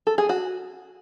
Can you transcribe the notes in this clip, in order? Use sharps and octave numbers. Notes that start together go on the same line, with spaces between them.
A4
G#4
F#4